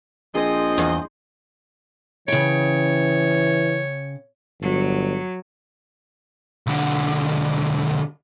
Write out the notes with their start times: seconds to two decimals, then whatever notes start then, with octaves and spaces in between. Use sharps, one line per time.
0.35 A#1 F3 C4 G#4 C5 D#5 G#5
0.78 E2
2.28 C#3 E3 C#5 G5
4.61 G1 F#3
6.67 B1 D3